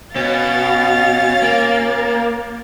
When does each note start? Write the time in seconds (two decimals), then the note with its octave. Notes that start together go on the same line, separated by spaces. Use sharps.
0.16 B2 C#4 F5 A6
1.42 A#3